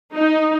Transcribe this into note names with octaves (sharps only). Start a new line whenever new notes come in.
D#4